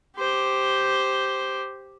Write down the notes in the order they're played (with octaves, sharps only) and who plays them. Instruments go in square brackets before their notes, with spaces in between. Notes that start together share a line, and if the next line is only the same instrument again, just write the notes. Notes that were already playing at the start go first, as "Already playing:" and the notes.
[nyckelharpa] G4 C5